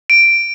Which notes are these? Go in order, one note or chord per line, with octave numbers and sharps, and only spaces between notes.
D7